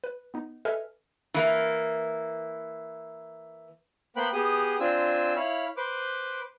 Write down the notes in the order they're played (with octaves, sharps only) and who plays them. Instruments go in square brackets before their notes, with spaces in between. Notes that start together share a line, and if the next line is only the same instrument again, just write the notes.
[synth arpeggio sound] B4
B3 D#4
A4 B4 D#5 E5 G#5 F6
[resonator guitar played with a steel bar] E3 A#3
[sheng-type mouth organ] A#3 B3 C5 G5 B5 F#6
B3 G4 G#4 D#6
C4 D4 F4 G#5 E6
E4 C#5 F5 B5
B4 C5 D6